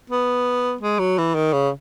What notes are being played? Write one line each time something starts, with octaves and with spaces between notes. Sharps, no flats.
B3
G#3
F#3
E3
D#3
C#3